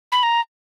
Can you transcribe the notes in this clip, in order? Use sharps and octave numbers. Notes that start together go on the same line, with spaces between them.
B5
A#5